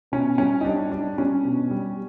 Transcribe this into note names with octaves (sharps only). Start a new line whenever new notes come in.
B2 C#4
G3 C#4
D#4
G3 D4
G3 D4
G3 C#4
B2
G3